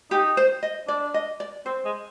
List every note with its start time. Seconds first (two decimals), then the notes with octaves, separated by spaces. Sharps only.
0.11 D#4 G4
0.37 C5
0.63 D#5
0.88 D4 D5
1.14 D#5
1.40 D5
1.66 C4 C5
1.85 G#3